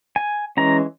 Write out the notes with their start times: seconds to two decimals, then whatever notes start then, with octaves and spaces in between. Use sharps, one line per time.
0.16 G#5
0.57 E3 G#3 C#4 A#5